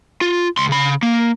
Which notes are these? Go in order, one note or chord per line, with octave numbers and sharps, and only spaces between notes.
F4
C#2 C6
C#3 B5
A#3